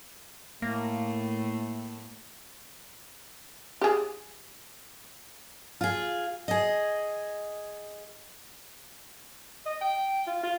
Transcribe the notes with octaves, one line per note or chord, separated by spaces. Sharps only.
A2 A3 A#3
G4 G#4
F4 G#4
G#4 D#5
D#5
G5
F4
F4